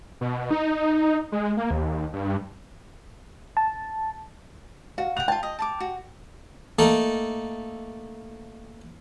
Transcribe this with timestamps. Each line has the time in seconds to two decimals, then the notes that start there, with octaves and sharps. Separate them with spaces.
0.21 B2
0.51 D#4
1.32 G#3
1.57 A#3
1.71 D#2
2.13 G2
3.57 A5
4.98 F#4 F5
5.17 F#5 G5 F7
5.28 F4 G5 A5
5.43 D#5
5.59 A5 C6 D6
5.80 F#4
6.79 A3 A#3 D#4 A4